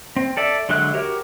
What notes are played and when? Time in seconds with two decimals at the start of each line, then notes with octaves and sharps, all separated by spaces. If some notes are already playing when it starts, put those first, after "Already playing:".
0.16 C4
0.37 A4 D5 E5
0.69 D3 F#3 G#3 E5 F#6
0.94 F#4 G4 A#4 C#5